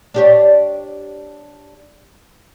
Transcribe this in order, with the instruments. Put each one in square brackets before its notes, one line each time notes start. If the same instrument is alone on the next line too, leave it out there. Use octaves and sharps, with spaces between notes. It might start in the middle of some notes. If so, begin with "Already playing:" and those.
[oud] D4 G4 C#5